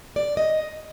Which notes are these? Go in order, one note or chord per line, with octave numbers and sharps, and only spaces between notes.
D5
D#5